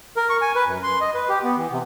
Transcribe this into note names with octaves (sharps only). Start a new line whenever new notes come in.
A#4
C#6
G#5
B4
F#2
C6
D#5
B4
G4
B3
E3
C3